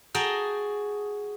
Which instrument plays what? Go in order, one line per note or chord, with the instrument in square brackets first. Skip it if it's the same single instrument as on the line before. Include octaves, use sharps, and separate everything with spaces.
[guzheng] F#4 G#4 G5 A5 A#5